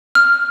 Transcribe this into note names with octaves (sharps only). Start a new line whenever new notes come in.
F6